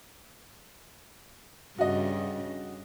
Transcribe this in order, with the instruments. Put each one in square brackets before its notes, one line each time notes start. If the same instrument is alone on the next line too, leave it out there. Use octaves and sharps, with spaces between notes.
[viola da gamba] G2 C#3 [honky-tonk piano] F#4 D#5